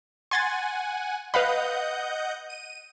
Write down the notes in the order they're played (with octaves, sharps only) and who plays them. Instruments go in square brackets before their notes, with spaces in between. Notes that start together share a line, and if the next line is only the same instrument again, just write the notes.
[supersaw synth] F#5 G#5 [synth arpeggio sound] C6 G#6 A6
[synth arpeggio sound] B4 F5 B5 [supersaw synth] D#5 F#5 G6
[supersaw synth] D#7